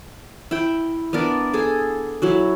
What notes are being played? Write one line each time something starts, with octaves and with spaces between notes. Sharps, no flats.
E4 G5
B3 D4 A#4 D5
G#4 A4
F#3 E4 F#4